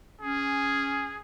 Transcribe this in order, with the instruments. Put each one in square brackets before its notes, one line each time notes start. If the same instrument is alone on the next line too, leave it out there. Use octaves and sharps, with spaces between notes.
[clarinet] C#4 [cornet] G#4